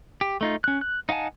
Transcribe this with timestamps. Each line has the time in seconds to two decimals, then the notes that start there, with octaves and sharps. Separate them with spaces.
0.21 G4
0.41 A3 D#4 F4
0.64 C#4 F#6
0.81 F#6
1.09 D#4 F5 F#5 G#5 A5